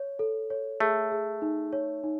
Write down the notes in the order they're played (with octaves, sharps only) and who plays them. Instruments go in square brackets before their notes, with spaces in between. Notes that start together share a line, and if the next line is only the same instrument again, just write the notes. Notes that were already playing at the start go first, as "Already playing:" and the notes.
Already playing: [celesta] C#5
A4
C#5
[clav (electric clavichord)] A3 [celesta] G#4
[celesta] G#4
D#4
C#5
D#4